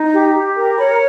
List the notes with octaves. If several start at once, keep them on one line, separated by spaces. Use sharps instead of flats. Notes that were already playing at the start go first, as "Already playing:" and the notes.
Already playing: D#4
G4
G4
A#4
C#5 B5